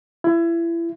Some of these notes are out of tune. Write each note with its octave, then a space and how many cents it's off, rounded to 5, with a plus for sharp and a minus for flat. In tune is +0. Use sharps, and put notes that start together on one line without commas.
E4 +30